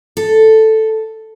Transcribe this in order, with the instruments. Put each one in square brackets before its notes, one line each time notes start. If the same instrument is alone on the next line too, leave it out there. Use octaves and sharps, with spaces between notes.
[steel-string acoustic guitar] A4